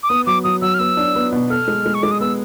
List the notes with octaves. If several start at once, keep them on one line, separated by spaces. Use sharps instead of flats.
D6
B3 D#6
F#3 D6
F#3 D#6
F#3 E6
F6
B3 E6
D4
B3
B2
A4 F6
G#3
G#3
C#6
G#3 D6
D#6
B3 E6